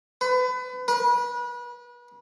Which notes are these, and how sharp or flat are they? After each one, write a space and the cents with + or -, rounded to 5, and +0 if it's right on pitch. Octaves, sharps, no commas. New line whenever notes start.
B4 +30
B4 -35